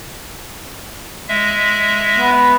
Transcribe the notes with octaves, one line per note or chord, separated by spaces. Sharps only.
G#3 E5
B3